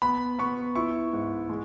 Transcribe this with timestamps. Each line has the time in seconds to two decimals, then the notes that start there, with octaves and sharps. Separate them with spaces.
0.02 B3 B5
0.39 B3 C#6
0.75 E4 C#6
1.13 G#2
1.49 G#3